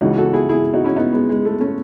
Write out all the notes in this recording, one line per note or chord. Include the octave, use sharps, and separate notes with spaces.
C#2 C#3 E3 D#4 F#4
F#4 A4
E4 G#4
E4 G#4
D#4 F#4
C#4 E4
B3 D#4
G#3 B3
G#3
A3
A3 C#4